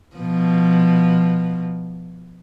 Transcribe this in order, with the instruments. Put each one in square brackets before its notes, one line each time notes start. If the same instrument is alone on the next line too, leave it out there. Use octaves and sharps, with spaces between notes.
[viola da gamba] B2 F3